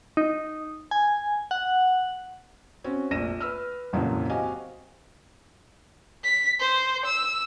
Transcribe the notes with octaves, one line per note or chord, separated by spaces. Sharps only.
D#4
G#5
F#5
C4 C#4 F#4
F1 A#1 A#6 D#7 E7
B4 E6 F6
G#1 F2 A#2 C#3 E3 F#3
C4 F#4 G4 D#5 F5 G#5
B6
C5
E6